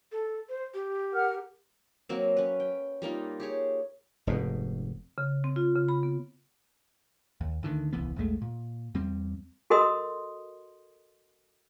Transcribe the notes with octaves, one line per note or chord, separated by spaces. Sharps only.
A4
C5
G4
A#4 F#5 F6
F#3 A#3 C4
C#4 B4
G5
G3 A#3 D#4 F4
G4 G#4 C#5
F1 G#2 B2
C#3
C4
F4
C#3
B5
B3
D#2
D2 D3 D#3
D#1 C2 E3 B3
A#1 E2 G#3 A3
A#2
E2 G3 C4
F#4 A4 A#4 D#5 C6 D#6